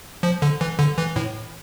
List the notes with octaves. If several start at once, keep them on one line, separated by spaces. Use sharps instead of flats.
F3
D3
E3
D3
E3
A2